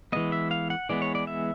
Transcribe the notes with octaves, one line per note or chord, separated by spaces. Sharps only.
E3 G#3 B3 D#5
E5
F5
F#5
E3 G#3 B3 D5
C#5
D5
E5